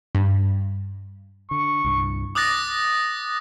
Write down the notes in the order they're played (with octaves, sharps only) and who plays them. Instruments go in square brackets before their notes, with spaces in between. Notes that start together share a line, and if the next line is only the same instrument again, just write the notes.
[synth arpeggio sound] G2
[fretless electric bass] D3 [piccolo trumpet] C#6
[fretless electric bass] C2 G2
[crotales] D6 D#6 F#6 A6 A#6